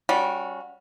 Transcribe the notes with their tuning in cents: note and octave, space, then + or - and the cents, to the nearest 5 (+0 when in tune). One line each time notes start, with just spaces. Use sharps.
G3 -10 C#4 +0 F#4 -30